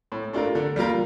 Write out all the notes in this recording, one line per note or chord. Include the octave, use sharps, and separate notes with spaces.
A2
A3 D4 F4 A#4
D3
G3 A#3 F4 A#4